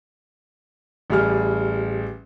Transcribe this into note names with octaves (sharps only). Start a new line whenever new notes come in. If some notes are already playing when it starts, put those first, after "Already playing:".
A1 G3 G#4 F6